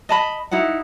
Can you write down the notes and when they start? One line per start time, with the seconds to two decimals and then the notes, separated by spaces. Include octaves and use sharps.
0.09 D#5 A5 B5
0.51 D#4 E4 F#4 F#5